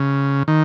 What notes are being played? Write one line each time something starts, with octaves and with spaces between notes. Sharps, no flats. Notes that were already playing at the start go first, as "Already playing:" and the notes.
Already playing: C#3
D#3